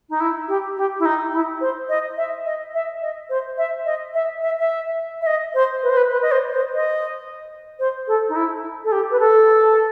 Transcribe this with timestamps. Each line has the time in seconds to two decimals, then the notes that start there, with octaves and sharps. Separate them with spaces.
0.09 D#4
0.20 E4
0.48 G4
0.77 G4
0.99 E4
1.05 D#4
1.32 E4
1.60 C5
1.89 D#5
2.17 E5
2.45 D#5
2.73 E5
3.01 D#5
3.29 C5
3.57 E5
3.85 D#5
4.13 E5
4.41 E5
4.58 E5
5.21 E5
5.26 D#5
5.54 C5
5.83 B4
5.89 C5
5.96 B4
6.10 B4
6.22 D#5
6.31 C5
6.53 C5
6.74 D#5
7.79 C5
8.07 A4
8.28 D#4
8.35 E4
8.84 A4
8.91 G4
9.11 B4
9.19 A4